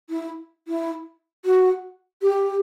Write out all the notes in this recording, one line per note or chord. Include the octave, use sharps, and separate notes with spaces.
E4
E4
F#4
G4